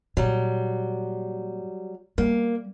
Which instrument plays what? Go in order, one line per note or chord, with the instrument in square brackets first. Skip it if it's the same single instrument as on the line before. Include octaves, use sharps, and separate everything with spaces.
[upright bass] A#2 [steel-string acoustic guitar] F#3 G3
[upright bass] G3 [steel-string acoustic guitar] A#3